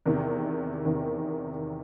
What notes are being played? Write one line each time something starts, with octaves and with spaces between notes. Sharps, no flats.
E2 C3 D#3
E2 C3 D#3